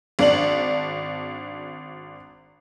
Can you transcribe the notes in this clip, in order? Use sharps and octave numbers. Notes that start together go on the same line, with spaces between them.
G#1 D4 D5 F#7